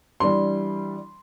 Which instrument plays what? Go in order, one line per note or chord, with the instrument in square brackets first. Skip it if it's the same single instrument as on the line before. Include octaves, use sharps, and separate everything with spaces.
[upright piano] E3 G3 D4 C6